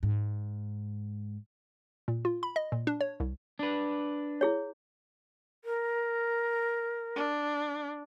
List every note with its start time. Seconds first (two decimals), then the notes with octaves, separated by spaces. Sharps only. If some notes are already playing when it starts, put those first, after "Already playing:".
0.03 G#2
2.08 A#2
2.25 F4
2.43 B5
2.56 D#5
2.72 A#2
2.87 D4
3.01 C#5
3.20 C2
3.59 D4 B4
4.41 E4 G#4 C#5
5.65 A#4
7.16 D4